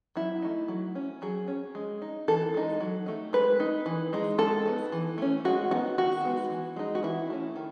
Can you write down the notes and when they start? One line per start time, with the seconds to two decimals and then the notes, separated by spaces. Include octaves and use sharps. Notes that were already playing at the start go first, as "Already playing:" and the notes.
0.16 F#3 E4
0.42 A3 D#4
0.68 F#3
0.95 C#4
1.22 F#3 G#4
1.48 C#4
1.75 G#3
2.02 D#4
2.28 E3 A4
2.54 G#3 D#4
2.80 F#3
3.06 A3 D#4
3.33 G#3 B4
3.60 D#4
3.86 E3
4.13 G#3 D#4
4.38 G#3 A4
4.66 B3 D#4
4.92 E3
5.18 A3 C#4
5.45 G#3 F#4
5.71 B3 D#4 F#4
5.98 D#3 F#4
6.25 G#3 B3 D#4
6.50 E3
6.76 G#3 D#4
6.95 F#4
7.03 E3 E4
7.30 A3 C#4
7.56 D#3